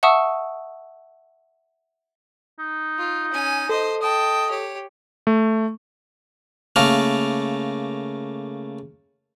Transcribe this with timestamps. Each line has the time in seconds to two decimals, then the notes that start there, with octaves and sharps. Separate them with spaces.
0.03 E5 F#5 A5 C#6 D#6 E6
2.59 D#4
2.98 F4
3.32 C#4 G#5
3.69 A4 C5 D#5
4.02 D#5 G5 A5
4.50 G4 C#5
5.27 A3
6.76 C#3 A3 A#3 A4 A#4